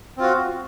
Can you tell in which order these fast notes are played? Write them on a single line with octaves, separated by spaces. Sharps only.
C4 F4 F#4